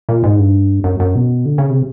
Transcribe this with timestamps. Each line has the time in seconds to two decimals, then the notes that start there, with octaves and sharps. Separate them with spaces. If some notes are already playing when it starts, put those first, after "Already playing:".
0.09 A#2
0.24 G#2
0.39 G2
0.84 F#2
1.00 F#2
1.15 B2
1.45 D3
1.58 C#3
1.70 C3